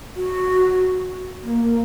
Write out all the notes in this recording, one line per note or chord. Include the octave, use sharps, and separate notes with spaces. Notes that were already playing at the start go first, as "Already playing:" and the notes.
F#4
A#3